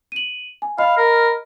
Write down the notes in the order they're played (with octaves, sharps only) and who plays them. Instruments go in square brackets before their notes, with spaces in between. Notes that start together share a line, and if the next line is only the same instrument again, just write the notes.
[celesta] D#7 F#7
G#5
[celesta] D#5 B5 F6 [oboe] F5
[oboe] A#4